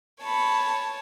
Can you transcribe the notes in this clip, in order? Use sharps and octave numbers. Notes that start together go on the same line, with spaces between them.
C#5 A5 B5 C#6